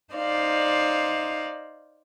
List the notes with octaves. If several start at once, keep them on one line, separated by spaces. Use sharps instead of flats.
D#4 C5 D5 F5